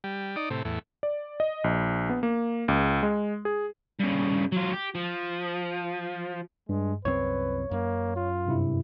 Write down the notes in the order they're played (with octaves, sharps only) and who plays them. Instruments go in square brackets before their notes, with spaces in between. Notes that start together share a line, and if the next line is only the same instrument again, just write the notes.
[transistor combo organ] G3
D#4 D5
A2 C3
E2 A2
[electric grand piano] D5
D#5
A#1
B3
A#3
C#2
G#3
G#4
[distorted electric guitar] G2 C#3
F#3 F4
G4
F3
[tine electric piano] G2 [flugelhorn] G#3
[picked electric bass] C2 F#2 C4 [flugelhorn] B4 [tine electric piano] C#5
[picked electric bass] F#2 [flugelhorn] A#3
[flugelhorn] F4
[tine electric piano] G2 C3 E4